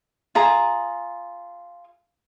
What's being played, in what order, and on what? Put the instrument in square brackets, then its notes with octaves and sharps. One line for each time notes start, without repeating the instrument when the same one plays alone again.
[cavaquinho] F4 G#4 A#5